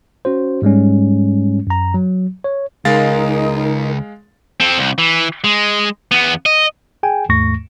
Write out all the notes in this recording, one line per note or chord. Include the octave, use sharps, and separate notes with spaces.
C#4 F#4 C5
G#2 G3 G#3 C#4
F#2 A#5
F#3
C#5
C#2 G#3 D#4 A#4 F5 A6
C4 A4
C2
E3
G#3
E2 B3
D#5
G#4 G5 G#5
D#2 G#2 A3 C#6 A#6